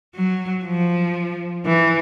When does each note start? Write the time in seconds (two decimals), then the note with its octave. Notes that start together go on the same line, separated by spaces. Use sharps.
0.15 F#3
0.65 F3
1.66 E3